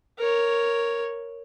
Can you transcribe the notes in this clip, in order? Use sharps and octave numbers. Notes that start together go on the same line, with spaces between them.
A#4 C#5